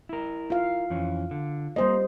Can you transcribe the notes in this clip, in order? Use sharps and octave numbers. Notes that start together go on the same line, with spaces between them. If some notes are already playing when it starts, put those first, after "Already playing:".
E4 A#4
F4 F5
F2 E3 C#4
D3
G3 A#3 C5 D#5